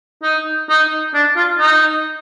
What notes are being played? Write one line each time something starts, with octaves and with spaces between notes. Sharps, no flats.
D#4
D#4
D4
F4
D#4